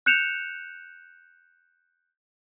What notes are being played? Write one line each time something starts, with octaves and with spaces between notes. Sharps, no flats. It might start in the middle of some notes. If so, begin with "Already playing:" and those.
F#6 G6 C#7 E7 F7